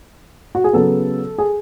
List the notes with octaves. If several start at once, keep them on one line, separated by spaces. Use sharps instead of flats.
F#4
G#4
C#3 F#3 B3 A4
G#4